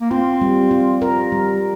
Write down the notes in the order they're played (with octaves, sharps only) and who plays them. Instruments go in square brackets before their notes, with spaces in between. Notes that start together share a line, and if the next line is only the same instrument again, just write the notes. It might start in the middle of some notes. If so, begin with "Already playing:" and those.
[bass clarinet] A#3
[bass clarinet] C4 [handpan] F4
[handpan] G3
F4
A#4
G3